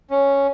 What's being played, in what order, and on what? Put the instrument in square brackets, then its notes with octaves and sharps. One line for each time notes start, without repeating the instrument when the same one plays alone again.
[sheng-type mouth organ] C#4